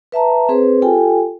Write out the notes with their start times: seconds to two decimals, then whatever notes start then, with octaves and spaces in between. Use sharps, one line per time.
0.12 B4 E5 A5 A#5
0.49 C4 G#4 B4 C5
0.82 F4 G4 A4 G5 G#5